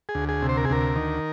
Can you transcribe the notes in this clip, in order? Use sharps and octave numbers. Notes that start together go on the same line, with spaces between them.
G#4
D2
G#4
C3
C5
A#4
G#4
D2 A#4
D#3